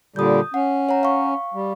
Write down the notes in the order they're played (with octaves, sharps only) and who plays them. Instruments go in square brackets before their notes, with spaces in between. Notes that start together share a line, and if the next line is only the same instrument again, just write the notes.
[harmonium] A#2 D3 G3 [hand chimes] D#6 G6
[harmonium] C#4 [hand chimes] F#5
[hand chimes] C#5 F#5 A#5
F5 C#6
[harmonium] G3